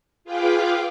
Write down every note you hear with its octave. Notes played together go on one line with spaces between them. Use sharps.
F4 G#4 B4 F5 G5 D6